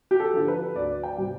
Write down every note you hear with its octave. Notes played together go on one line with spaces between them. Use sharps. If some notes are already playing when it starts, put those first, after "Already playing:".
G4
A4
D3 F3
B4
D2 D5
G5
C3 G3